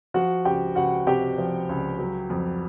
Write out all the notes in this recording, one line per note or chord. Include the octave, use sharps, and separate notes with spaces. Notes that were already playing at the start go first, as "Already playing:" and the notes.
F3 F#4 F#5
C#2 G4 G5
C#2 F#4 F#5
C3 G4 G5
F3
C#2
F#3
F2